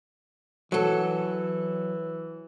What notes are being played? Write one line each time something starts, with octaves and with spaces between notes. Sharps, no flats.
E3 F#3 A4